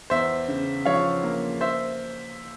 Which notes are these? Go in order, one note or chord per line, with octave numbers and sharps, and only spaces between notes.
E2 C5 E5
C#3
F3 C#5 F5
A#3
C5 E5